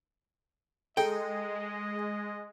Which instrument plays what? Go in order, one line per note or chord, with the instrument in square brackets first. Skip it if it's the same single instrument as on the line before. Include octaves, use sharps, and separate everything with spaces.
[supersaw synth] G#3 [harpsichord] D#4 G#4 A4 [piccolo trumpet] D#5 [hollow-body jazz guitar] G5